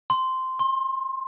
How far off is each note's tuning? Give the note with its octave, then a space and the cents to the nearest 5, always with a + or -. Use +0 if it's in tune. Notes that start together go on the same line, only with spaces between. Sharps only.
C6 -10
C6 +35